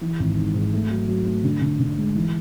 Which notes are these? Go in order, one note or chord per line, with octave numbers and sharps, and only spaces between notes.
E3
G#1
G#2
G#2
A3
F#3
F#3
A3
D3
D3
D3
G#3
E3